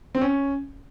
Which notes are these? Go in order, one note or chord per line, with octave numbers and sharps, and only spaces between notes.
C4
C#4